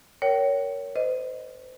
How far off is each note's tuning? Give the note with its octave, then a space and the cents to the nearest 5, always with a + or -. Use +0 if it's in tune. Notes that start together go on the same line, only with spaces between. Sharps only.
A#4 +0 C#5 +15 G5 -30
C5 -35 D#5 +0